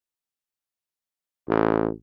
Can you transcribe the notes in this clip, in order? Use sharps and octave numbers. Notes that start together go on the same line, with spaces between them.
A1